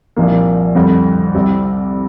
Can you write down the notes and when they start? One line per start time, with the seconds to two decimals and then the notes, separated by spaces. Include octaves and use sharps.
0.16 C2 A#2 F3 A#3
0.75 F2 D3 G3
1.35 C2 C3 G3 C4